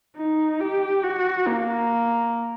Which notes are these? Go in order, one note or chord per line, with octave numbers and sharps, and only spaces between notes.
D#4
G4
F#4
A#3